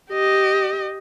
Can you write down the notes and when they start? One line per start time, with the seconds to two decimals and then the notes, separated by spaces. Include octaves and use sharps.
0.11 G4 D#5